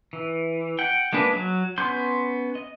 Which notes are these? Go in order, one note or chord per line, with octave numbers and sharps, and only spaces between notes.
E3
F#5 G5
G#3 A#3 D4 B4
F#3
B3 C#4 C6 G6
D#5